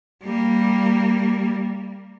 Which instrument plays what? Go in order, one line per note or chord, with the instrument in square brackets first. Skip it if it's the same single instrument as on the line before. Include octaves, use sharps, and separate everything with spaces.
[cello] G3 A#3